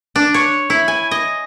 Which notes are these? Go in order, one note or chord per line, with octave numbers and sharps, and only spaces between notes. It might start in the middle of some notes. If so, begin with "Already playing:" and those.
D4
C#5
E4
G#5
D#5